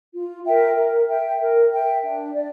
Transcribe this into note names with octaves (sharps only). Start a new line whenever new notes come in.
F4
A#4 E5 G5
A#4
E5 G5
A#4
E5 G5
D4
D5